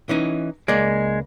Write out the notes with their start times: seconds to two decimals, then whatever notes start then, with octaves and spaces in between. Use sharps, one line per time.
0.09 E3 C#4 D#4
0.68 C#2 G#3 A#3 D5